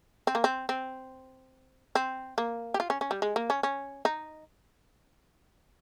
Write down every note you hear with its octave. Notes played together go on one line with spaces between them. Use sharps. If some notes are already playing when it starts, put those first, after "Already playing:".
C4
A#3
C4
C4
C4
A#3
G4
F4
C#4
C#4
G3
G#3
A#3
C#4
C#4
D#4